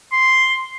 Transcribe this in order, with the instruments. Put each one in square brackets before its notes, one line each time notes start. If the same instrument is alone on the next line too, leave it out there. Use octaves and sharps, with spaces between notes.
[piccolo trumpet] C6